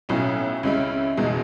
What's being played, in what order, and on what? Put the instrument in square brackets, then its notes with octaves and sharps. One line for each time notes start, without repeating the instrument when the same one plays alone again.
[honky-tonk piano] B1 A2 F#3 C#4 E4
C#2 C#3 G#3 C#4 E4
F#1 E2 B2 G#3 D#4